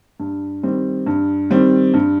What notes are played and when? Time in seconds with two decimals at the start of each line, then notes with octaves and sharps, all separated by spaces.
0.20 G2
0.63 D#3 G3 C4
1.07 G2
1.50 D#3 G3 C4
1.94 G2